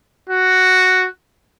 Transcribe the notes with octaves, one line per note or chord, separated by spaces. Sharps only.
F#4